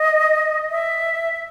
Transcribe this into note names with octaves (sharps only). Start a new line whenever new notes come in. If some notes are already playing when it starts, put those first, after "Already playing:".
Already playing: D#5
E5